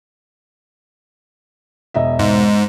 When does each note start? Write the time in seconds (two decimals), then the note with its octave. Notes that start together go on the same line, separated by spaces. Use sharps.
1.94 E1 D#5 E5
2.19 G#2